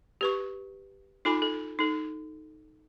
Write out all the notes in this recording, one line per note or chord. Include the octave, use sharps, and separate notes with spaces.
G4 B4 C#6
D#4 F4 A4 G#5 B5
A4
D#4 A4